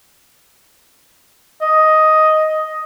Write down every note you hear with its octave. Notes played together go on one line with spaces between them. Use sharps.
D#5